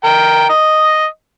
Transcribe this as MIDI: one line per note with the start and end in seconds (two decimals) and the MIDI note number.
0.04 0.47 70
0.04 0.47 79
0.50 1.05 75